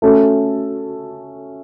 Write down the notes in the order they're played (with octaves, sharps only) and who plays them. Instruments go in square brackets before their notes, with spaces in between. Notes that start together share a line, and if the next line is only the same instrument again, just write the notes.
[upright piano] A3 C#4 F#4 A4